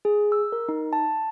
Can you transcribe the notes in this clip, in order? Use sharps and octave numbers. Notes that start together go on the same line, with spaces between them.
G#4
E6
A#4
D#4
A5